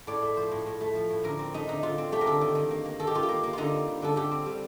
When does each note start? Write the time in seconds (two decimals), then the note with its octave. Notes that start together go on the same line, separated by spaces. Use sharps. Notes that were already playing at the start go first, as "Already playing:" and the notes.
0.07 A2 D5
0.22 A3
0.36 F3 C5
0.52 A2
0.66 A2
0.81 A3
0.95 F3
1.10 A2
1.23 D3 A#4
1.39 C4
1.54 A3 D#4
1.68 D3 D#4
1.83 D3 F4
1.98 C4
2.12 A3 G4
2.21 A#4
2.26 D3 A4
2.41 D#3
2.55 D#3
2.71 A#3
2.85 A#3
2.99 D#3 A4
3.07 G4
3.14 D#3 F4
3.23 G4
3.29 A#3
3.43 A#3
3.53 D3 D#4 F4
3.73 C4
3.88 G3
4.02 D3 A4
4.16 D3 G4
4.31 C4
4.46 G3